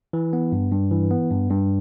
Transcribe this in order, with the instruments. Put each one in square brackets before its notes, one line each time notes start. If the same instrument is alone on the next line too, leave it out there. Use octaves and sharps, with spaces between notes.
[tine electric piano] E3
B3
G2
G2
E3
B3
G2
G2